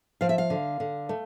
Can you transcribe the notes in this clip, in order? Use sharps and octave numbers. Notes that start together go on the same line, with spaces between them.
F3 F5
E5
F5
D3
D3
A3